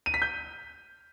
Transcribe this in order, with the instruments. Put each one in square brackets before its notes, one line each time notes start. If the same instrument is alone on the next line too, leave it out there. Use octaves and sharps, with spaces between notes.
[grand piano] D#7
B6
G6